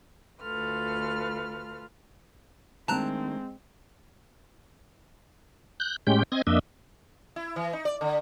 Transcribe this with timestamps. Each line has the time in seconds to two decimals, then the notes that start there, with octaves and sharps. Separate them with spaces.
0.41 D2 F4 A4 B4 C6 F6
2.88 D#3 G#3 A3 C4 D4 A5 A#5 F#6
5.80 F#6 G6
6.07 A2 G#3 C#4 G4 G5 G6
6.32 C4 D#5 G#6 A#6
6.47 F2 A#3 D4 D#5 E5
7.36 E4
7.56 E3
7.73 D#4
7.85 D5
8.01 D3